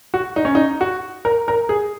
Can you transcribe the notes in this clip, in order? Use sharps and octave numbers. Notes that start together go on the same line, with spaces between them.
F#4
D#4
C#4
D#4
F#4
A#4
A#4
G#4